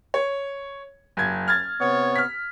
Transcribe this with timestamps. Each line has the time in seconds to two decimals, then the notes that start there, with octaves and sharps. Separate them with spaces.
0.14 C#5
1.17 F#1 G#6
1.48 F6 G#6 A6
1.80 C3 B3 C#5
2.16 F6 B6